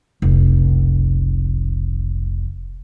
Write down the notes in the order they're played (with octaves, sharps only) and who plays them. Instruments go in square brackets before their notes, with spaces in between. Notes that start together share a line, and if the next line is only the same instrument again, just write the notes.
[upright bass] F1 B1